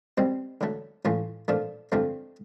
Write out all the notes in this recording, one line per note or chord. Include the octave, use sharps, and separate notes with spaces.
C2 B2 G3 C4
D3 F#3 A3
A2 E3 A3 C#4 F4
A#2 F3 A3 D4
G2 D3 F3 A3 C4